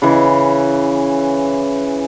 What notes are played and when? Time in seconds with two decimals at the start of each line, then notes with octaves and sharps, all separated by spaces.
0.02 C#3 E3